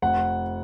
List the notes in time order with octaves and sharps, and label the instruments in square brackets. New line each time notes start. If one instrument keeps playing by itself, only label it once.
[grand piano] F1 F#5